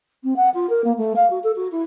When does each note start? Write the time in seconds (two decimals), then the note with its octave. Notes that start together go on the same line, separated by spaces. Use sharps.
0.23 C4
0.36 F#5
0.54 F4
0.69 A#4
0.84 A#3
0.97 A3
1.16 F5
1.30 F#4
1.43 A4
1.55 F#4
1.71 E4